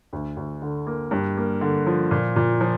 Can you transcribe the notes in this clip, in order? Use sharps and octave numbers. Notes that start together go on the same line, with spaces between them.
D2
D2
D3
A#3
G2
A#3
D3
F3
A#2
A#2
F3